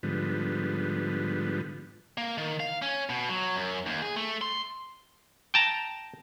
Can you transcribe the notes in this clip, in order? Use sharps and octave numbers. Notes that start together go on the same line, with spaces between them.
G#2 D3 F3 G3 B3
A#3
D#3
F5
C#4
B2
F#3
F#2
D#2
G#4
A3
C6
G5 A5 A#5